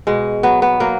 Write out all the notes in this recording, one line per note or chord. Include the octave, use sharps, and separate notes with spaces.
B2 G#3
F#3 B3
B3
F#3 A#3